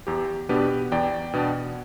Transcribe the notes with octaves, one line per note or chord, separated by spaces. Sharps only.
E2 G4
B2 B3 D4 G4 B4
E2 D5 G5
B2 B3 D4